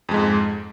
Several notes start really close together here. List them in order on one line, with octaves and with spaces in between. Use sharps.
F2 G#3 G#2